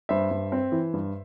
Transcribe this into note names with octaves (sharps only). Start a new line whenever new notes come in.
G2 C5 E5
G2
C4
E3
G2